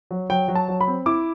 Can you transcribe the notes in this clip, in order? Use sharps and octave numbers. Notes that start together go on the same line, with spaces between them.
F#3
F#3 G5
F#3
A5
F#3
B5
C4
E4 D6